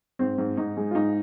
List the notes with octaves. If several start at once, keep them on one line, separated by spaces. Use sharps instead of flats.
G#2 C4
G#2
G#2 D#4
G#3
F4
G#2 D#4